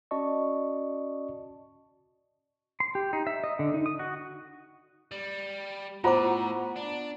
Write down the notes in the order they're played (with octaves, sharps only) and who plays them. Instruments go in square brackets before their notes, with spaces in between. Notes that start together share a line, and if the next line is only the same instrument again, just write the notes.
[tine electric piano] C#4 F#4 D5 D#5 A5 C#6
[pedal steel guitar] C6
G4
D#4
E5
D#5
D3
D#4
D#6
F#4
[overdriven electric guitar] G3
[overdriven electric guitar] A2 [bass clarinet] B3 [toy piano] F4 C5 D6 [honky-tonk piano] F#5 A#5 B5
[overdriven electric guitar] D4